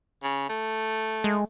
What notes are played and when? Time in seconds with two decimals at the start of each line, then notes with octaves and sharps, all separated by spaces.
0.23 C#3
0.49 A3
1.24 G#3